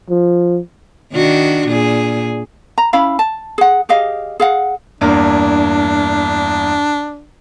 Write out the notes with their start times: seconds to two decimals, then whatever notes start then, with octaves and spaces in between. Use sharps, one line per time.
0.10 F3
1.13 D#3 D4 F#4
1.68 A#2 G#4
2.78 A#5
2.93 C#4 E4 F5 B5
3.19 A5
3.58 G#4 F#5
3.89 G4 G#4 D#5 F5
4.40 G#4 F5 F#5
5.01 E2 G2 A#3 D4